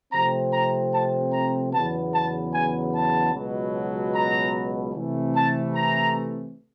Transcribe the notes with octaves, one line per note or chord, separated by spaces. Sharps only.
C3 F3 A3 C4 A#5
A#5
A5
A#5
E2 C#3 F#3 B3 A5
A5
G#5
A5
C#2 B2 F#3
A#5
C3 E3 A3
A5
A#5